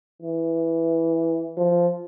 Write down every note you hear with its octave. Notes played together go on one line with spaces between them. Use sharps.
E3
F3